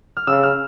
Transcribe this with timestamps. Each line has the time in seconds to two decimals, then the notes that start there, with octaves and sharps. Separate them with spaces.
0.17 F6
0.27 C#3 E6
0.43 F6